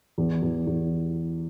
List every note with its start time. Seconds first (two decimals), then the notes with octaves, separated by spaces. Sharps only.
0.18 E2
0.42 E2
0.67 E2